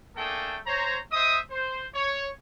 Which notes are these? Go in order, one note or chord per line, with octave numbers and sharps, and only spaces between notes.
A3 A#3 D4 G#4 A4 G5
C5 C#5 A#5
C5 D#5 E5 D#6
C5
C#5